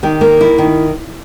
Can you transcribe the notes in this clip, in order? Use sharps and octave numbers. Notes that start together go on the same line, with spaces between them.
D#3 G4
A#3
E4
D#3